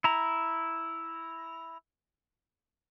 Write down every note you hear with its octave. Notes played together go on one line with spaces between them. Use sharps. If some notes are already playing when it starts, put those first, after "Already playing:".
E4 A#5